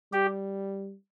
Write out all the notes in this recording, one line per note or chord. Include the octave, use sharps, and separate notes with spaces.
G3 G4